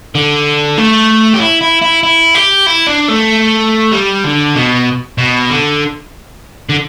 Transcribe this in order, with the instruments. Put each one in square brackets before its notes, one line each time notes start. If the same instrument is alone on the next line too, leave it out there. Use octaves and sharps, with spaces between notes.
[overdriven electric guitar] D3
A3
G4
E4
E4
E4
E4
G4
E4
D4
A3
G3
D3
B2
B2
D3
D3